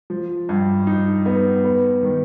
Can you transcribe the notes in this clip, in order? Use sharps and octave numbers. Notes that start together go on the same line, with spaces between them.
F3
G2
D#4
B3
B3
D#3